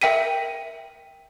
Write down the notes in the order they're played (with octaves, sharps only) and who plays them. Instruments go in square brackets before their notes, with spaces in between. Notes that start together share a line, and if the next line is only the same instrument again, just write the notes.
[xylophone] A#4 E5 G5 B6 D#7